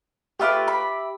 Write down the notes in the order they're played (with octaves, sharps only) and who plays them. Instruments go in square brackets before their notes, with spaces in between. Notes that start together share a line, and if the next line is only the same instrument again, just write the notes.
[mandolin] A3 F4 B4 [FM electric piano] G4 E5 D6
[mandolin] B5